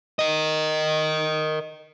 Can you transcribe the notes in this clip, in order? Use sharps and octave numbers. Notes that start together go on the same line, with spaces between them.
A#4 D#5